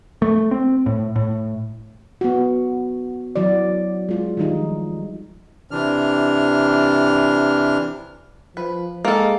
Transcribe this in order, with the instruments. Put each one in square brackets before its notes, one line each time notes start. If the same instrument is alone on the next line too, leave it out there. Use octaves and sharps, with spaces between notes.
[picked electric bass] A3
C4
A2
A2
[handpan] B3 F#4
E3 F#3 F#4 D5
G#3 F4
D#3 F3 G3 D#4
[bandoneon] C3 E3 D4 F6
[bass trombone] F3 [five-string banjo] B4
[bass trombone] G#3 [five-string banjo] A#3 A4